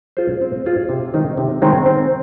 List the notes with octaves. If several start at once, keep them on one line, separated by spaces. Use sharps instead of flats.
F4 G#4 C5
C4
F4 G#4 C5
C3
D#3 G#3 C4 D#4
C3
D#3 G#3 C4 D#4
C4